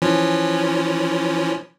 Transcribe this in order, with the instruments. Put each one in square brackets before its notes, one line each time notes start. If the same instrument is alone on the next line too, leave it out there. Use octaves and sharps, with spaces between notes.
[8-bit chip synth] E3 F3 C#4